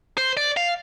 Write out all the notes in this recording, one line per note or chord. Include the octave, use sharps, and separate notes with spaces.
C5
D5
F5